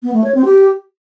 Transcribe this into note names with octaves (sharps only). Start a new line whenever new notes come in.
B3
A3
C#5
C4
G4